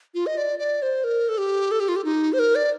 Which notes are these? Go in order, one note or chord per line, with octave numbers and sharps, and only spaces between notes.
F4
D#5
D5
D5
C5
A#4
A4
G4
A4
G4
F4
G4
D#4
C5
A#4
D5